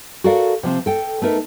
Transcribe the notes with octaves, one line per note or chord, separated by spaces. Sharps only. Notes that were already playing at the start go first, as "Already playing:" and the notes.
F#4 A4 A#4 D5 F5
C3 F3 C4
A4 G5
A3 B3 D#4 A#4